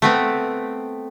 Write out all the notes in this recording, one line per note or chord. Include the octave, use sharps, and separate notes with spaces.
A3 B3 C4